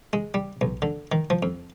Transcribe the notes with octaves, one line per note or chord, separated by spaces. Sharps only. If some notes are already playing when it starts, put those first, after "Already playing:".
G#3
G3
B1
D3
D#3
F3
F2